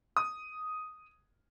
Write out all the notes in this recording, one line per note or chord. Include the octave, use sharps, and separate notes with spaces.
D#6